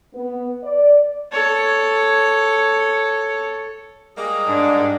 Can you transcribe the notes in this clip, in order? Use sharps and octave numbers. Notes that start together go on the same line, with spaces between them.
B3
D5
A4 C#5
G3 G#3 A#3 G#4
G#2 D4